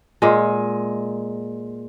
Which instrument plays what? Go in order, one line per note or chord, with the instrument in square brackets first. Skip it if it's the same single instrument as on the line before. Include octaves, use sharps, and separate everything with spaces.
[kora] A#2 G#3